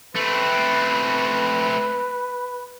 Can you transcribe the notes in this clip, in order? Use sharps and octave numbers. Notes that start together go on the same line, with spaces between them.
A3 C4 B4